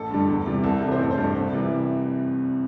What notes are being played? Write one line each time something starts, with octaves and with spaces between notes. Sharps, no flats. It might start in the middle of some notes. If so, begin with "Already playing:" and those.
Already playing: A1 A4
G2 D3 G3
E2
C3 E3 G3
C2 A4
C3 E3 G3
C5
A1 A4
C5
G2 G3
C2
C3 E3 G3